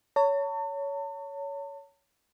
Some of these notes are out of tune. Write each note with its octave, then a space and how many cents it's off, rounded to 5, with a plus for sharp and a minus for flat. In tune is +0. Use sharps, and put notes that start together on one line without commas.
C#5 +20 A5 +45